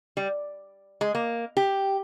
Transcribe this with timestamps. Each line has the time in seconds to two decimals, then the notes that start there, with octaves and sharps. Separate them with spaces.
0.17 G3
1.01 G#3
1.15 A#3
1.57 G4